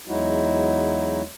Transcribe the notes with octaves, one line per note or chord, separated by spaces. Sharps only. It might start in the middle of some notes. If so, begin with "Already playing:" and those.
E2 F#3 G#3 D#4 E4 F#4